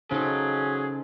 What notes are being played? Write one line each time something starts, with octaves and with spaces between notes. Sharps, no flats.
C#3 F#3 D#4 G#4 A4 C5